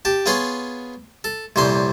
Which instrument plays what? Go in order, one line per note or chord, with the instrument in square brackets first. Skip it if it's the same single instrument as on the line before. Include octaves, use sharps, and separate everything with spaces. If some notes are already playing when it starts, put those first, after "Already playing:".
[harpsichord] G4 A5
B3 F4 G#4 C#5 C6
A4
C2 F2 A#2 C#4 C5 C6